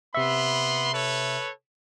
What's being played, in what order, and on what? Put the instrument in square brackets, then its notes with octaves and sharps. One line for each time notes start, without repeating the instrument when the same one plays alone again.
[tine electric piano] C3 E5 [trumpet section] B3 B5 C6
[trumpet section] A4 B4 C#5